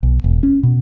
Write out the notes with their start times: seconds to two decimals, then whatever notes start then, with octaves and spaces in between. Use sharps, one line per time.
0.03 B1
0.24 E1
0.43 C#4
0.63 B2